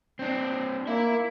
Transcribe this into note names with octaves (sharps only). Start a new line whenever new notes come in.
C4 D4
A#3 E4 E5